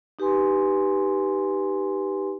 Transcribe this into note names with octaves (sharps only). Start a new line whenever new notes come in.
D#4 G4 B4 G#5 C6